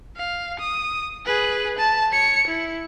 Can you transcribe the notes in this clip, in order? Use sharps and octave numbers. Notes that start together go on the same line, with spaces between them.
F5
D#6
G#4 B4
A5
C#5 C#7
E4